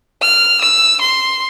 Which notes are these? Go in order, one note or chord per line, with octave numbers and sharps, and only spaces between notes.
F6
E6
C6